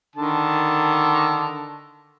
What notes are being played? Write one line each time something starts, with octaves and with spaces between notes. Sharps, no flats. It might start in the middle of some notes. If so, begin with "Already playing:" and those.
D3 D#3 A5